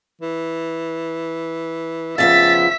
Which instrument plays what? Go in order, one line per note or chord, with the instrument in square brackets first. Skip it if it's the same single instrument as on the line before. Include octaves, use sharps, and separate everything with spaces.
[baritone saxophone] E3
[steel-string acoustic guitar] F2 F3 B3 [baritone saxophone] C#3 [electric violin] E5 B6 [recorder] A6